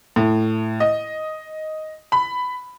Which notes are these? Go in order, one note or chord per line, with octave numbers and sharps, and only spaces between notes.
A2
D#5
B5